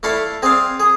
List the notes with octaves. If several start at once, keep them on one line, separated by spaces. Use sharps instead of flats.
A3 E4 A4 D5 F5
C4 G#4 D5 F5
G#4